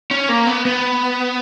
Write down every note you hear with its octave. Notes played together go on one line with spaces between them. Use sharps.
C#4
A#3
B3
B3